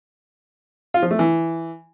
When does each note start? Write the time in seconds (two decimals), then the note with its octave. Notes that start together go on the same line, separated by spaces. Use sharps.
0.94 F4
1.03 F3
1.11 A3
1.19 E3